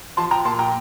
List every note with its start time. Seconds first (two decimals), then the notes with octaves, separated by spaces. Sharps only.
0.17 F3 A5 C6
0.31 G5 A#5
0.45 A#2 A5 C6
0.59 G5 A#5